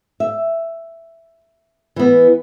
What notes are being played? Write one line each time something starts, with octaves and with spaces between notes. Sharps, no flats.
E5
E3 B3